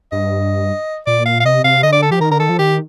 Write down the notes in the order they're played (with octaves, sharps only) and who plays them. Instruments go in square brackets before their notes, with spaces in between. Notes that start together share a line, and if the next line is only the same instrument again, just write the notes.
[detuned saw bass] G2 [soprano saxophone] D#5
[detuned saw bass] A#2 [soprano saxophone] D5
[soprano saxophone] F5
F5
[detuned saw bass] C3 [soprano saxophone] D#5
[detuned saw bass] C3 [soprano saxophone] F5
[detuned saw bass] D3 [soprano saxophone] D#5
[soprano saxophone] D5
A4
[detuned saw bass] F3 [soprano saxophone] G4
[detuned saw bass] D#3 [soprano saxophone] A#4
[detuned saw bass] D3 [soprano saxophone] A#4
[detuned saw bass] D#3 [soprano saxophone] A4
[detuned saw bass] F3
[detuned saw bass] D#3 [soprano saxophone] G4